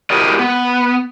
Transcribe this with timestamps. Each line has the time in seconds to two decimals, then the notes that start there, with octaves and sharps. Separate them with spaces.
0.10 E4 F#4 G4 A#4 D5 D#5
0.39 B3